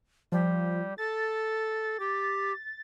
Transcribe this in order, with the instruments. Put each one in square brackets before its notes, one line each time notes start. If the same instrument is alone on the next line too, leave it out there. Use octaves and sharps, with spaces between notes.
[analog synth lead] F3 [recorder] G3
[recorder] A4 [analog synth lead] A6
[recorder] G4